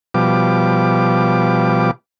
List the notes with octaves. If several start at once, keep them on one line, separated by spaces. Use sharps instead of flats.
B2 F3 G3 D6